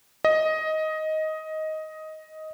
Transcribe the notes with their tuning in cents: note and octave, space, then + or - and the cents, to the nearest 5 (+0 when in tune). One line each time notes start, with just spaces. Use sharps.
D#5 +10